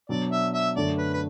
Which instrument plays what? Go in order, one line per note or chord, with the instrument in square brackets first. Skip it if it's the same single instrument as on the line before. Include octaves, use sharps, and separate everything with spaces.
[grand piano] B2 F#3 D4 [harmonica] D5
[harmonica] E5
E5
[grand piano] F#2 D3 A3 D4 [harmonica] D5
[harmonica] B4
B4